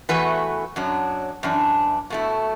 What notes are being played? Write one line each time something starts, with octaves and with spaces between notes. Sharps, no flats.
E2 E3 A3 F#4 B4
F#2 F#3 D4
F#2 E3 D4
B2 A3 E4